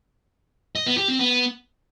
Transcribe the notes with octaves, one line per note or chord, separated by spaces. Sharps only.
D#5
B3
G4
C4
B3